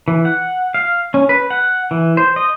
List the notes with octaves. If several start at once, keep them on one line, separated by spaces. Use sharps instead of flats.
E3
F#5
F5
C#4
B4
F#5
E3
C5
D#5